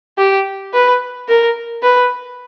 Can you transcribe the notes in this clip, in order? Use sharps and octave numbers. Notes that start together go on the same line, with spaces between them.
G4
B4
A#4
B4